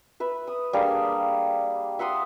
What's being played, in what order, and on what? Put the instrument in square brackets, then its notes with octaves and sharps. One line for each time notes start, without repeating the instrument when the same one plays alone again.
[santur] B4 E5
D#6
G3 A#3 D4 G#4
E5 F#5 C6 D#6